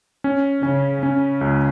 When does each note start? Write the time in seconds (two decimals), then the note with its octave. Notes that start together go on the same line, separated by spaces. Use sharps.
0.24 C#4
0.63 C#3 C#4
1.02 C#3 C#4
1.41 C#2